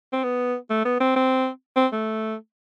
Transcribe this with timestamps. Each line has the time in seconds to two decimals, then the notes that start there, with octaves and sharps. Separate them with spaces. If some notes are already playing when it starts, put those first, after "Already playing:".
0.13 C4
0.24 B3
0.70 A3
0.85 B3
1.00 C4
1.16 C4
1.76 C4
1.92 A3